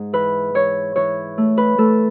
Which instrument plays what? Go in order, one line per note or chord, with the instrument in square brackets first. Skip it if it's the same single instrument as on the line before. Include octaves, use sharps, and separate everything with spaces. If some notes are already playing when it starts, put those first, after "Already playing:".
Already playing: [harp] G#2
E3 B4
E3 C#5
E3 C#5
A3
B4
A3 A4